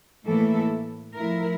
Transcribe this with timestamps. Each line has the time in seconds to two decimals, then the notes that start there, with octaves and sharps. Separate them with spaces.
0.26 A2 E3 A#3 E4 A4
1.16 F3 A3 E4 A#4